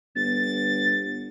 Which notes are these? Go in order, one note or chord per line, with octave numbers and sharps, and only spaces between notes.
G1 A6